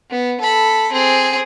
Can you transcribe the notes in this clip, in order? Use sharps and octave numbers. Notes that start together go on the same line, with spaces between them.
B3
A4 B5
C4 G#4